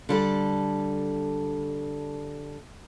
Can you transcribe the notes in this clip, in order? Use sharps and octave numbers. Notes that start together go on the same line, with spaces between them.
D3 G3 A4